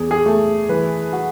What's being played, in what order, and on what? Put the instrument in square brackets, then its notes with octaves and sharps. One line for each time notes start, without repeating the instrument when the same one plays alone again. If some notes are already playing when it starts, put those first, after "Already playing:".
Already playing: [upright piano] E2 [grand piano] G#4
[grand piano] G#4
[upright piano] A3
[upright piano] E3 [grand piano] B4
[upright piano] F#4